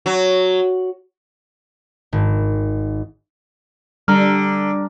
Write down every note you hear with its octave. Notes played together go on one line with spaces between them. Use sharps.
F#3
G#1
D3 G3 A#5 F6